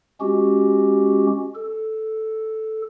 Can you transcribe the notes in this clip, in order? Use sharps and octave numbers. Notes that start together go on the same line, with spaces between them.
G#3 C#4 F#4 G4
A4